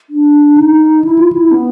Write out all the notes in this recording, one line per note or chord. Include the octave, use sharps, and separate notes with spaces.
D4
D#4
E4
F4
E4
B3